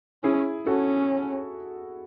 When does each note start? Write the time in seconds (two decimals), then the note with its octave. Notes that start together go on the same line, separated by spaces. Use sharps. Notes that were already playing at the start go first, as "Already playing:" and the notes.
0.23 C#4 E4 G#4
0.67 C#4 F#4 A4